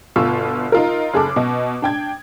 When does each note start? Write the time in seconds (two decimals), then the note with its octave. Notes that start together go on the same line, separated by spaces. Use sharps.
0.16 G1 B2 F4 C#6 E6
0.72 D#4 F4 A#4
1.14 F#1 G#4 A4 D6
1.36 B2 D#5
1.82 D4 G5 G#6